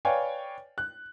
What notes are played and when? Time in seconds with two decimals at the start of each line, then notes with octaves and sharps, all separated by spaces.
0.05 B4 C#5 D5 F5 G5 G#5
0.78 F#6